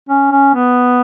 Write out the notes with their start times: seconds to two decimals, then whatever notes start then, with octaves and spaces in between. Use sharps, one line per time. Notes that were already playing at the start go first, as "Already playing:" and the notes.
0.09 C#4
0.32 C#4
0.55 B3